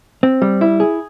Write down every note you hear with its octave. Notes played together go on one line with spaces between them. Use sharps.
C4
G3
E4
G#4